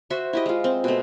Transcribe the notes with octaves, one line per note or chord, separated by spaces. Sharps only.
F#4 C5 E5
E4 G4 D#5
G#3 F4
C4
B2 A3